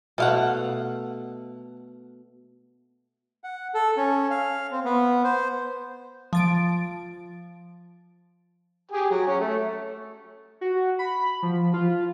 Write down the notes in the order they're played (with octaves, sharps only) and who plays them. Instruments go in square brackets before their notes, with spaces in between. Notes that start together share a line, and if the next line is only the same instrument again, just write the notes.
[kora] B2 A3 [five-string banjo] A4 F5 F#5
[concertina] F#5
A4
C#4
F5
C4
B3
C5
[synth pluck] F3 A6 D7
[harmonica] G4 G#4
F#3
C#4 C#5
A3
[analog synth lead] F#4
B5
F3
F4